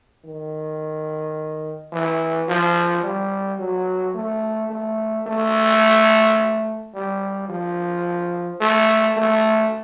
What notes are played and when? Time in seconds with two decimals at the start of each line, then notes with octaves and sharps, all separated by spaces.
0.24 D#3
1.92 E3
2.48 F3
3.03 G3
3.59 F#3
4.15 A3
4.70 A3
5.27 A3
6.94 G3
7.49 F3
8.60 A3
9.17 A3